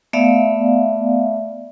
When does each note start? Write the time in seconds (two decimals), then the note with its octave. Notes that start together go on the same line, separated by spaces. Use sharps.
0.13 A3 B3 D5 E5 F5